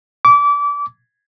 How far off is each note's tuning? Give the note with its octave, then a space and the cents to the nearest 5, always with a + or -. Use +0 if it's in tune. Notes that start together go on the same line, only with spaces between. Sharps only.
D6 -25